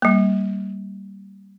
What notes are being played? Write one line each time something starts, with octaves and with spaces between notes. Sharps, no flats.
G3 A#3